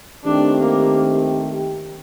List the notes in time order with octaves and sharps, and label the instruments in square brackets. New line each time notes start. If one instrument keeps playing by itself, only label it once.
[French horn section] D#3 A3 C4 G4 [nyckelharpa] D4
[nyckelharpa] A#3